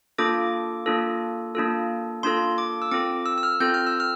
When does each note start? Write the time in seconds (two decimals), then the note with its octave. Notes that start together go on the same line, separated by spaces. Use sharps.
0.18 A#3 D4 F4 A4 D6
0.86 A#3 D4 F4 A4
1.55 A#3 D4 F4 A4
2.23 A#3 D4 F4 A4 C6
2.58 D6
2.82 E6
2.91 C4 F4 A4 D6
3.26 E6
3.38 E6
3.43 F6
3.60 C4 F4 A4 G6
3.74 F6
3.86 E6
4.00 F6